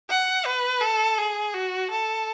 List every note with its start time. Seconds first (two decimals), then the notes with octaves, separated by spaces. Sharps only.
0.10 F#5
0.45 B4
0.81 A4
1.18 G#4
1.54 F#4
1.91 A4